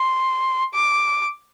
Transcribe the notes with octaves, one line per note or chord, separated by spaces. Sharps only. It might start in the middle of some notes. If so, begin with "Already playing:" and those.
Already playing: C6
D6